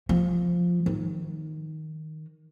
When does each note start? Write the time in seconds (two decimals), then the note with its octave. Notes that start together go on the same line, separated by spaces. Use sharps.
0.09 F3
0.86 D#3